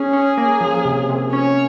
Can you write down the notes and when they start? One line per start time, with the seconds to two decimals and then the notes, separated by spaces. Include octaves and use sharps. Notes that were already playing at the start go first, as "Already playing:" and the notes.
Already playing: C#4 G#4
0.13 C#4
0.38 A#3
0.61 F3
0.85 C3
1.09 C3
1.32 C#4 C#5